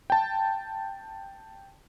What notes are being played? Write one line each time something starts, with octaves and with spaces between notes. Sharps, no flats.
G5 A5